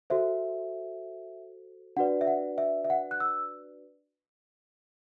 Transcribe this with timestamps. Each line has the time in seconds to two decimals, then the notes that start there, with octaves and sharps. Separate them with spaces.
0.10 F#4 A4 C5 E5
1.97 D4 F#4 B4 D5 F#5
2.21 E5
2.27 F#5
2.58 E5
2.85 E5
2.90 F#5
3.11 F#6
3.20 E6